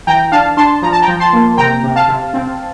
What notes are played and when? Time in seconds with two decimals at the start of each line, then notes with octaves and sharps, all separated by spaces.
0.07 E3 G5 A#5
0.32 D4 F5 A5
0.57 D4 A5 C6
0.82 F3 A#5
0.92 A5
1.02 G5 A#5
1.08 F3
1.20 A5 C6
1.33 A#3
1.57 C3 G5 A#5
1.83 C3
1.96 F5 A5
2.08 C3
2.34 C4